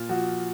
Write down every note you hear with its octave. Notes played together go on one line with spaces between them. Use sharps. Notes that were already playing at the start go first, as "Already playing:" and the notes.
Already playing: A#2 F4
F3 F#4